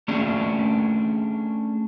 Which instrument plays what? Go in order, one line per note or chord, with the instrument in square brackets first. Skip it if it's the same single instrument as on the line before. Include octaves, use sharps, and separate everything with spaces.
[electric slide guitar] A3 C#4 D4 G#4